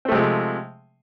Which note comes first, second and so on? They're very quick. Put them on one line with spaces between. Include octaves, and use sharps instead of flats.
C4 A3 C3 G#3 F3